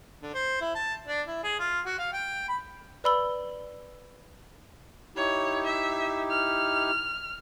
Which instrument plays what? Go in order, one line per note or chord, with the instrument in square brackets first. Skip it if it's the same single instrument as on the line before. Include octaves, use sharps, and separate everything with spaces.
[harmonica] D3
C5
E4
A5
D4
E4
G#4
F4
F#4
F5
G5
B5
[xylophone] B4 D5 B5 E6 G7
[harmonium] D#4 E4 G4 [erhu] C#5
[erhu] E5
F6